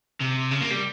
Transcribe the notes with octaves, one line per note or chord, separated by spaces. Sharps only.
C3
C#3
A#3
G3